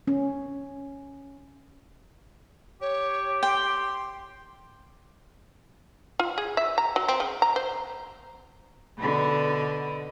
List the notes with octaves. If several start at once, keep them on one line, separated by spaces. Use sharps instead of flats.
C#4
G4 C#5
G5 C6
F4
G#4
E5
A#5
F#3
C4
C#3
A#5
C5
B2 D3